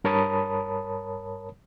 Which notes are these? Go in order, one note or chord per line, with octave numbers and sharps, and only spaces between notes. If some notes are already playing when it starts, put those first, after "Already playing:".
G2 A#4 C#5 A5 B5 D#6